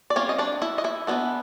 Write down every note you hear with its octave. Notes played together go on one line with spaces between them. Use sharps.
D5
G3 C4 C#4 F4 C#5
D#5
D4 D5
E4 E5
D#5
E4 E5
E3 G#3 B3 D4